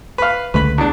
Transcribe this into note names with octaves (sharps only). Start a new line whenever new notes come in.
B4 F5
C#2 D3 A3 B4 B5
E2 D4